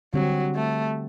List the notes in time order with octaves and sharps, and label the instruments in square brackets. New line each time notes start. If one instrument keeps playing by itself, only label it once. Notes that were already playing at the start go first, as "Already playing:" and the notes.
[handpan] D3 G3 C4 G4 [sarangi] F#3
[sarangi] A3